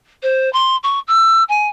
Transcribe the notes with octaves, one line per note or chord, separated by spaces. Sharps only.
C5
C6
C#6
E6
G#5